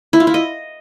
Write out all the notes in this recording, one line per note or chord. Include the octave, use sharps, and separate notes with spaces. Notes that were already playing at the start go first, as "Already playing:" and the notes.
E4
F4
E4
D#5